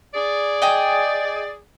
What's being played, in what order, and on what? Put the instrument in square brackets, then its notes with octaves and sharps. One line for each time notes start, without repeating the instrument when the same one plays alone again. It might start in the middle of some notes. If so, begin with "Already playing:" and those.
[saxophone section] G#4 D5
[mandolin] D#5 G5 G#5